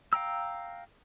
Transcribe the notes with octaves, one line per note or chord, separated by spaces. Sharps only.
F5 G5 A#5 E6